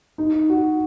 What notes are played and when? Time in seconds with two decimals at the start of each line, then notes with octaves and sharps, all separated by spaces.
0.18 D#4
0.50 F#4